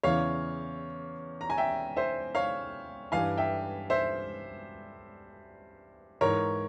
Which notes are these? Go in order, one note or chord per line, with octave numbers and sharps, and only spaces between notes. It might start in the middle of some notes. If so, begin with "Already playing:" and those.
E2 C#3 E3 C#5 F5
A#5
G#5
E5 G5
C5 E5
C#5 F5
G2 E3 F5 G#5
E5 G5
C5 E5
G#2 E3 A#4 C#5